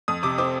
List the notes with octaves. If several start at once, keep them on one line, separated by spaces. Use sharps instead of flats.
F2 D#6
C3 D6
C4 D6